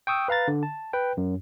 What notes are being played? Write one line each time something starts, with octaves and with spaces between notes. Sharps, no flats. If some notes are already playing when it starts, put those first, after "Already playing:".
G5 C#6 D#6 E6
B4 F5 A#5 A6
D3
A5
B4 G5
F#2